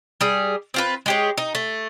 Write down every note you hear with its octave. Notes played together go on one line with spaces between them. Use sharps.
G3 G#4
C4 F4 B4
G#3 G4 C#5
D#4
A3